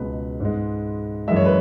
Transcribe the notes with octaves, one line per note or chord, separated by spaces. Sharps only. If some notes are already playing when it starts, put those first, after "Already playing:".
Already playing: C#2 B2 G#3 B4
G#2 G#3
F#2 E3 G#3 E5
C#5
B4